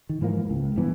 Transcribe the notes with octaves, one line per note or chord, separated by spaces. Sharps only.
D#3
G#2 E3 F3 A#3
C#2
A#1 G2 E3 B3